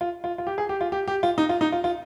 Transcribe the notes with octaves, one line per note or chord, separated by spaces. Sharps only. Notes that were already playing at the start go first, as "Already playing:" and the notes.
F4
F4
F4
G4
G#4
G4
F4
G4
G4
F4
D#4
F4
D#4
F4
F4